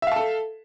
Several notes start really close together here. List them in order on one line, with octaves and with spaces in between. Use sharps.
E5 F5 A5 A4